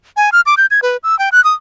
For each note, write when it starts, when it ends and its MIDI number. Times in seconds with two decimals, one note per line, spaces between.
0.17 0.30 80
0.32 0.41 89
0.46 0.55 86
0.57 0.66 91
0.71 0.80 92
0.82 0.97 71
1.03 1.18 88
1.19 1.29 79
1.32 1.43 90
1.44 1.54 87